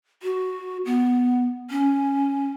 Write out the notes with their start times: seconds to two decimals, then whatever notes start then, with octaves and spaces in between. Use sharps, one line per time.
0.23 F#4
0.85 B3
1.71 C#4